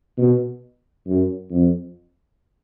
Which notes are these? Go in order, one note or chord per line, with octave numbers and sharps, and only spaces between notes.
B2
F#2
F2